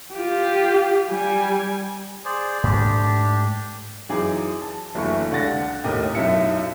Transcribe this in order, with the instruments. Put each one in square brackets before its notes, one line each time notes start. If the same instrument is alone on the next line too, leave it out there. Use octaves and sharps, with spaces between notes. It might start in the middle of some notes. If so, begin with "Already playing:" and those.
[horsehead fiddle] F4 G4
G3 G#5
[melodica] G#4 C5 D5
[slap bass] G#2 A3 [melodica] D4 G4
[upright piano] F#2 E3 D#4 G#4 D6
A5
F#1 D2 E3 E5 C#6
C#2 D3 F#5 A6 A#6
A1 D#2 A2 A#4 D#5
B1 F#2 D#4 E4 C#7